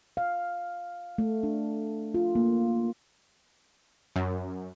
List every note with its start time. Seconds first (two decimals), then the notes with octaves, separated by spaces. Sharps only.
0.17 F5
1.18 A3
1.43 D4
2.14 F4
2.35 A#3
4.16 F#2